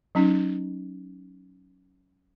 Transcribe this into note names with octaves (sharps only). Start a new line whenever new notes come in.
F#3 C#4 D#4